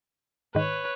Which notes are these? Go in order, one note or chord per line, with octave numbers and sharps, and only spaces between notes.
G#2 D#3 B4 C#5